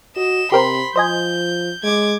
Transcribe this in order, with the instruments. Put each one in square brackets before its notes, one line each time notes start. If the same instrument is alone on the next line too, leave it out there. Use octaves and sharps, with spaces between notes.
[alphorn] F#4 [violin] D#5 E7
[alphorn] C3 [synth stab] G4 A#4 C5 [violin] B5 C6
[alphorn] F3 [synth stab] C5 D#5 G#5 [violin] G6
[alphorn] G#3 [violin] D6 G#6